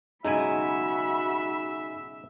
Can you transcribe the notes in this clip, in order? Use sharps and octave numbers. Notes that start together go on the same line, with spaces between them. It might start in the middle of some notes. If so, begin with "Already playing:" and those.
B1 C#3 G#3 D#4 F#4 E5 G#5 B5